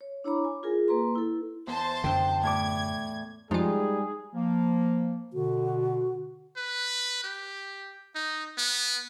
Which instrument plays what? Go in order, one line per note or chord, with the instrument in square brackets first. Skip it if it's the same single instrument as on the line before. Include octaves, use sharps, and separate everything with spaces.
[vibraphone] C#5
D4 E4 C#5 A#5 B5 D6
G#5
F4 G#4 A#4
A#3 B4 A#5 C6
E4 A4
[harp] E2 [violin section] C5 A5
[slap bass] F#2 D3 [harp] G5
[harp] A2 D5 D6 [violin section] G#6
[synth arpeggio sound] F3 F4 [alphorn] G3 [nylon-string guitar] G#3 D#4 [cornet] G#4
[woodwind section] F3 A#3
[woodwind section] B2 D3 [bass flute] F#4
[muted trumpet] B4
G4
D#4
B3